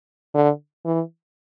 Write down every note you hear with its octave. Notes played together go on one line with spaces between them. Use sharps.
D3
E3